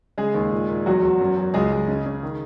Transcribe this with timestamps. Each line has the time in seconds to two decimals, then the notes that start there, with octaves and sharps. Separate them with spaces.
0.18 C#3 G#3 G#4
0.34 D#2
0.52 A#2
0.70 A#2
0.86 E2 F#3 F#4
1.03 E2
1.20 F#2
1.37 F#3
1.54 C#2 G#3 G#4
1.72 G#3
1.88 C#3
2.06 C#3
2.23 D#3